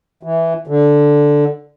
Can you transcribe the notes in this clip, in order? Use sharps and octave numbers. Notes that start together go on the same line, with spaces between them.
E3
D3